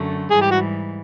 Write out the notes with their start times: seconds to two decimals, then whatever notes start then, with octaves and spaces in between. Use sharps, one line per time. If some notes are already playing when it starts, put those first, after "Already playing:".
Already playing: F#2 D3 F#3 A3
0.30 G#2 E3 G3 G#4
0.41 G4
0.51 F#4